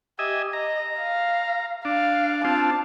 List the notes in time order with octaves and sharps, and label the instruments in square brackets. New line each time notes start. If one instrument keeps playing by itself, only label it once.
[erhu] G4 [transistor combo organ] D#5 E5 G#5
[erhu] D#5 [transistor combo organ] A#5
[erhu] F5
[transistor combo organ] D4 [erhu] F5
[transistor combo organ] C4 D4 F4 [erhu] A5